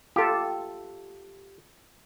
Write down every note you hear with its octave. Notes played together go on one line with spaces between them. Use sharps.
F4 G4 A4